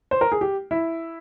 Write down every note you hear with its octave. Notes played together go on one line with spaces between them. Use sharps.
C5
A#4
G#4
G4
E4